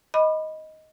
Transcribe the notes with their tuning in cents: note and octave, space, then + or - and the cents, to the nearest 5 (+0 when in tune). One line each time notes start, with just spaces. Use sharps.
D#5 +10 B5 +0 D6 +45